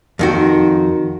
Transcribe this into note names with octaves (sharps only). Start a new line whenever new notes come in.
F2 D#3 F#4